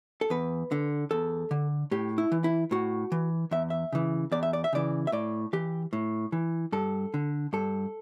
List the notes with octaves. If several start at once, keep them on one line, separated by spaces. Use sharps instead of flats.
A4
E2 B4
D3
E2 A4
D3
A2 G4
E4
E3
E4
A2 F#4
E3
E2 E5
E5
C#3 E3
E2 D5
E5
D5
E5
C#3 E3 D5
E5
A2 D5
E3 G4
A2
E3
G2 A4
D3
G2 A4